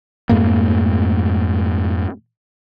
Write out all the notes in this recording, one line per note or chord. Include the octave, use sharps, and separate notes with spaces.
F2 G#2 A3 A#3